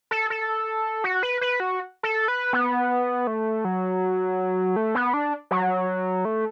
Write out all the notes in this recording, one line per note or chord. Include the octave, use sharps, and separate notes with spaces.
A4
A4
F#4
B4
B4
F#4
A4
B4
B3
A3
F#3
A3
B3
D4
F#3
A3